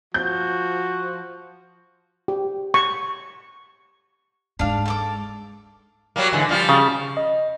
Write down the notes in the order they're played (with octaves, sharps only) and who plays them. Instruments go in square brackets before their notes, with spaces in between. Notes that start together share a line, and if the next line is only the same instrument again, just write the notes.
[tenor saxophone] F3 [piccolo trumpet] F#4 [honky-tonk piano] G6
[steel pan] G4
C#6
[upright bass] G#2 G#3 [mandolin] D4 F5
[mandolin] A4 C#6 D6
[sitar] F#3 G3 A#3
G#2 D3 E3
F3 G3 F4
[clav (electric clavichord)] C#3
[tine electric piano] D#5